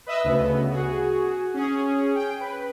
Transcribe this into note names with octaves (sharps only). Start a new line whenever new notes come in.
B4 D#5 E5 E6
D2 C#3 B3
F#4 G#4
C#4 G#4
G5
B4